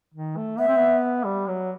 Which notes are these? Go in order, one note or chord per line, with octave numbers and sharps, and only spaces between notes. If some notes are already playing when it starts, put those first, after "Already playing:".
D#3
A3
B3 E5
C4
B3
G3
F#3